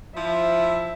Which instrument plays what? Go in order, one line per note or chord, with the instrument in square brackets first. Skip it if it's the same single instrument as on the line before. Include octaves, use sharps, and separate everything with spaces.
[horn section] F3 E4 [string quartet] E5